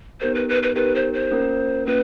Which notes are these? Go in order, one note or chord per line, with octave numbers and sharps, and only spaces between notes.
B3 D#4 G4 A#4 C5
B4
B4
B4
B3 D#4 G4 A#4 B4
C5
C5
A#3 C#4 F4 A#4
A#3 C#4 F4 B4